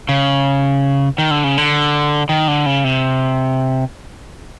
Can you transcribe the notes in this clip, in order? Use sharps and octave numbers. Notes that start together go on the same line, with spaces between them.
C#3
D#3
D3
C#3
D3
D#3
D3
C#3
C3